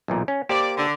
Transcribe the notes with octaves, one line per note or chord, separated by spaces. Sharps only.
B1 E2 A#2
C#4
A#3 G4 C5 D5
D3